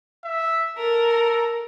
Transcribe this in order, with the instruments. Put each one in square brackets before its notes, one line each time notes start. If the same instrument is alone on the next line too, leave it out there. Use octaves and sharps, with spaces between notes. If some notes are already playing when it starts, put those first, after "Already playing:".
[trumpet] E5
[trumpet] A4 [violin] A#4